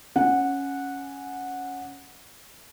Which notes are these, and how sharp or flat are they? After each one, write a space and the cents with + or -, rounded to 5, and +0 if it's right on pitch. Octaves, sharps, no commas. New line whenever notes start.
C#4 +0 F#5 -10